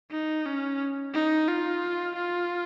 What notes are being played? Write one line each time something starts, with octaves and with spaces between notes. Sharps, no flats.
D#4
C#4
D#4
F4
F4